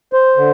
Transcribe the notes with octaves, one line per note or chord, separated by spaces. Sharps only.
C5
D3